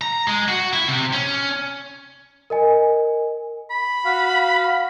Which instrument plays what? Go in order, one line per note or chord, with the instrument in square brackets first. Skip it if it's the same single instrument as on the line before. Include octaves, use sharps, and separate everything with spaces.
[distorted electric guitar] A#5
G#3
F#4
E4
C3
C#4
[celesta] A#4 D#5 G#5
[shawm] B5
[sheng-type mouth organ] F#4 F5